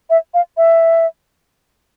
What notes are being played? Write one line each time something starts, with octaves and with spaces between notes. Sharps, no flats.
E5
F5
E5